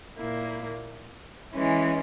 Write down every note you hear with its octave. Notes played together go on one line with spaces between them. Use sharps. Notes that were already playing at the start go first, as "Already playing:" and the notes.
A#2 A#3 E4
E3 G#3 C#4